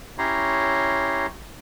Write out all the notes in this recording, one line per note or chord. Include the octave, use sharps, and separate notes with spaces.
C#4 E4 G4 C#5 A#5 C6